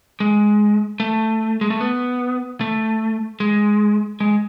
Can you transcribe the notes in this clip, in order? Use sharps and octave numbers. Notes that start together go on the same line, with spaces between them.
G#3
A3
G#3
A3
B3
A3
G#3
G#3